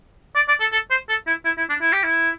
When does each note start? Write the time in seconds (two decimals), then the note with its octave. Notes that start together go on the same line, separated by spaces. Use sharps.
0.35 D5
0.48 D5
0.60 A4
0.72 A4
0.91 C5
1.09 A4
1.27 E4
1.45 E4
1.58 E4
1.69 D4
1.81 E4
1.92 G4
2.03 E4